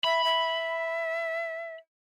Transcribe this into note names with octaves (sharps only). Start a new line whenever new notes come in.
E5 B5
E5